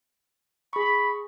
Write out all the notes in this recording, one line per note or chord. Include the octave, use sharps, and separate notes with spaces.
G#4 B5 C#6